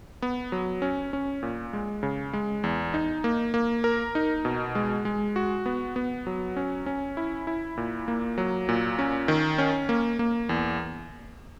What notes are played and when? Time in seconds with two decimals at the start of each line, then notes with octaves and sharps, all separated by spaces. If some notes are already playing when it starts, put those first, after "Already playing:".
0.22 B3
0.52 F#3
0.82 C#4
1.13 C#4
1.43 A#2
1.73 G#3
2.03 C#3
2.33 G#3
2.64 E2
2.94 D#4
3.24 A#3
3.54 A#3
3.84 A#4
4.15 D#4
4.45 B2
4.75 G#3
5.05 G#3
5.36 F#4
5.66 B3
5.96 B3
6.27 F#3
6.57 C#4
6.86 C#4
7.17 E4
7.47 E4
7.77 A#2
8.08 A#3
8.38 F#3
8.69 A#2
8.99 C#4
9.28 D#3
9.58 C#4
9.89 A#3
10.19 A#3
10.49 E2